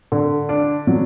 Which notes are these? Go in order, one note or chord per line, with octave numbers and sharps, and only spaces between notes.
D3
D4
F#3